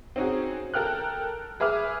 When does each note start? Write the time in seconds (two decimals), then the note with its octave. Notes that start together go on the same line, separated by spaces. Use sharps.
0.16 C4 C#4 D#4 F#4 G#4
0.74 A4 A#4 G5 F6 F#6
1.60 G#4 B4 E5 D6 F6